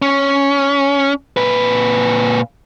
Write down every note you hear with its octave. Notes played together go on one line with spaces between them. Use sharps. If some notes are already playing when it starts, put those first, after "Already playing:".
C#4
A#2 B4